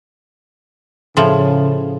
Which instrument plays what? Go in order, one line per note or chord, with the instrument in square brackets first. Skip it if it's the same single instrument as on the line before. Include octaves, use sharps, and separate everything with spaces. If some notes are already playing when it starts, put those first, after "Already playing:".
[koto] A2 F3 [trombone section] C#3